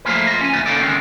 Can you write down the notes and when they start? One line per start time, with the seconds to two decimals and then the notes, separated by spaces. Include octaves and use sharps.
0.05 F3 A3 A#3 F4 G#4 B4
0.27 F4 D#5
0.41 C#4 G#5
0.53 D2 A#2 A3 B3
0.66 A#3 B3 C#4 D#4 A4 D5
0.81 D#3 G3 G#3 C4 C#4